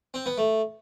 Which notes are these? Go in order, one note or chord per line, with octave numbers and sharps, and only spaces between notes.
C4
B3
A3